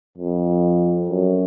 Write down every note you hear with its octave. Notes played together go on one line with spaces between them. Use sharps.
F2
F#2